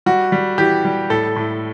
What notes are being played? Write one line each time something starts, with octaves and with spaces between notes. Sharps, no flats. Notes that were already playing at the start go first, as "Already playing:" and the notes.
G3 F#4
G3
E3 G4
G3
A2 A4
A2